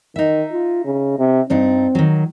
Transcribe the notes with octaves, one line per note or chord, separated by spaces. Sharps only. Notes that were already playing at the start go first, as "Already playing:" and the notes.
D#3 D#4 E5
F4
C#3
C3
G2 C4 D4 D#4
D#3 F#3